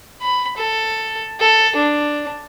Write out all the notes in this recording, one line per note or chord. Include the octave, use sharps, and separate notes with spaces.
B5
A4
A4
D4